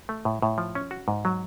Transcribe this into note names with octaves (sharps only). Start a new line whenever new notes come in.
A3
A2
A2
F3
C#4
F#4
G#2
F#3